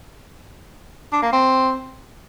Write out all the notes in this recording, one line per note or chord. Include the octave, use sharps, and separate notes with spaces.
D4
A#3
C4